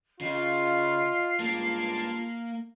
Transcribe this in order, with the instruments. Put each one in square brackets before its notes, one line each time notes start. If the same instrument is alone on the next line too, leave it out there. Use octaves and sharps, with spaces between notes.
[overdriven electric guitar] C#3 [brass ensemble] F4 [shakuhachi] D#5 [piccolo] C7
[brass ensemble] C#2 G2 A5 [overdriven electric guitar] A#3 [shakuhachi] F4